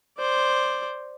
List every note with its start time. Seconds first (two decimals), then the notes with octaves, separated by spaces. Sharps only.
0.18 C5 D5